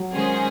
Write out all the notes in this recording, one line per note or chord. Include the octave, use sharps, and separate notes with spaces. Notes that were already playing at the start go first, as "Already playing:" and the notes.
Already playing: F#3
D#3 G#3 C#4 G#4 C5